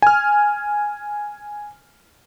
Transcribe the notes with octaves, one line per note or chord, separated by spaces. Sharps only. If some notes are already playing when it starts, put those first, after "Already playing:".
G#5 F6